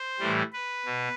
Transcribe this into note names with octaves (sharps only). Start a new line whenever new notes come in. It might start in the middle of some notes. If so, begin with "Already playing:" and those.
Already playing: C5
A2 E3 G3
B4
B2